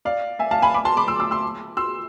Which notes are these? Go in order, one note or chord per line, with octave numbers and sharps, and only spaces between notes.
D5 F5
E5 G#5
F5 A5
G#5 B5
B5 D6
A5 C6
B5 D6
C6 E6
C6 E6
C6 E6
C6 E6